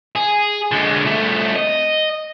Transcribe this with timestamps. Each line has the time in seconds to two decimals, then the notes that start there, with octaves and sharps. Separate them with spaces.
0.16 G#4
0.71 D3 G#3
1.05 C2 A3
1.55 D#5